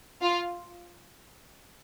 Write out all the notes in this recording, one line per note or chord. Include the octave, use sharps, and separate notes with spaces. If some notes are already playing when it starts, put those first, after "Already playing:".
F4